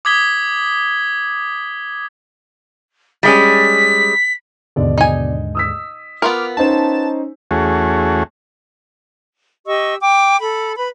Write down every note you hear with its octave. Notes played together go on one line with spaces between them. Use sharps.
D6 D#6 G#6 B6 G7
G3 G#3 C#4 B6
D#2 G#2 B2 D3 D5
D#4 G#5
D#6 E6 B6
B3 F4 A#4 D6 F6
C#4 D#4 C5 A5 E7
E2 A3 C#4 F#4 G#4
G4 D#5 C#6 E6
G5 D6
A4 B5
B4 B5